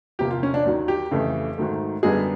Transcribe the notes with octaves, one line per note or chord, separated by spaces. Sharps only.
E2 C3 F3 A#3 G4
F4
C#4
D4
D#2 D#3 F#3
G4
F2 C#3 E3 A3
G#2 D#3 F#3 A3
F#2 D3 G3 B3 G#4